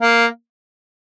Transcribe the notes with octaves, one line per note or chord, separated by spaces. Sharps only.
A#3